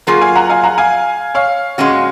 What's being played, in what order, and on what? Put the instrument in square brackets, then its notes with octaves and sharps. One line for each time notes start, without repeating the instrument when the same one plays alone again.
[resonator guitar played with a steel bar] F#3 A#3 F4 G#4 [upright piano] A#4
[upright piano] F5 G#5
F#5 A#5
F5 G#5
F#5 A#5
F5 G#5
C#5 F5
[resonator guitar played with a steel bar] A#2 G#3 C#4 F#4